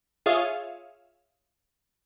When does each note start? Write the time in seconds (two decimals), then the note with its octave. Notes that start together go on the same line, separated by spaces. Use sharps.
0.26 F4 G#4 C#5 E5 F5 D#6